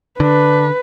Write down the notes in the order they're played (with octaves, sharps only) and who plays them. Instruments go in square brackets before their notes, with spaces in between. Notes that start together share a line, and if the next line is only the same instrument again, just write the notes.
[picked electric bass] D3 [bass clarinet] D4 [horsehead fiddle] B4